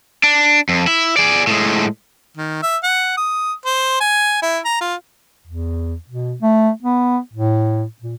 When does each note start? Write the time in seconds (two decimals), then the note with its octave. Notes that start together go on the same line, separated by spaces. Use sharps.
0.24 D4
0.69 F2
0.87 E4
1.17 G#4 D5
1.47 A2 G#3
2.37 D#3
2.63 E5
2.84 F#5
3.17 D#6
3.65 C5
4.01 G#5
4.43 E4
4.65 A#5
4.81 F4
5.47 E2
6.09 B2
6.42 A3
6.83 B3
7.33 A2
8.02 A#2